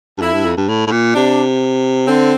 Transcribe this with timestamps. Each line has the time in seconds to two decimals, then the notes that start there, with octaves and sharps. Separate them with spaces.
0.18 G2
0.22 F2 E4
0.34 G2
0.45 F2
0.57 G2
0.69 A2
0.87 A2
0.92 A#2
1.15 C3 D4
2.08 D3 C4